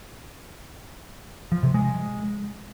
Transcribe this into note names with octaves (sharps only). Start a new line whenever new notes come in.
F3
C3
G#3